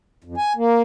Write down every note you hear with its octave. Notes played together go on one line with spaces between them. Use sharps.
F2
G#5
A#3